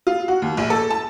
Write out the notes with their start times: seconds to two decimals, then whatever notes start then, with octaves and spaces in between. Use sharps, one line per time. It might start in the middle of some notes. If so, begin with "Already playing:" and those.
0.07 F4
0.28 F#4
0.42 D#2
0.57 A#1
0.70 A4
0.90 A5